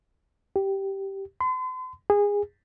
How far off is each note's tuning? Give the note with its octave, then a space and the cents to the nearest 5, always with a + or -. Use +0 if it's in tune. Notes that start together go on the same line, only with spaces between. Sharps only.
G4 -10
C6 -45
G#4 -25